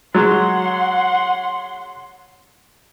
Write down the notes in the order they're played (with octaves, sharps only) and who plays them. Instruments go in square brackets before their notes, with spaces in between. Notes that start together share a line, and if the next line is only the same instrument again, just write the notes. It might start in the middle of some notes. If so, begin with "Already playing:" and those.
[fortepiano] F#3 G#3 [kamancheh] F#5 C6